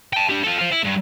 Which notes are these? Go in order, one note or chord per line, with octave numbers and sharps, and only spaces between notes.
G5 A5
D4 G4
F4 A4
C5 F5
E4
G2